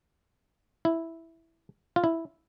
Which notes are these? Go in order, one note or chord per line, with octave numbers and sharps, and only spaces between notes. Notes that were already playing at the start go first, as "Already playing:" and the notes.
E4
F4
E4